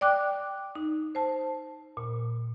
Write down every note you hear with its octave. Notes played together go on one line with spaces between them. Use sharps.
D5 G5 D6 F#6
D#4
C5 A5
A#2